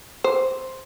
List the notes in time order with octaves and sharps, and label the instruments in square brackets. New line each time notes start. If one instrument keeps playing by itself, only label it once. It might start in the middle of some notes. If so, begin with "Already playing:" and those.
[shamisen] C5